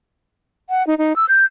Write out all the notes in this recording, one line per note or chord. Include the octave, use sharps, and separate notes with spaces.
F#5
D#4
D#4
E6
G6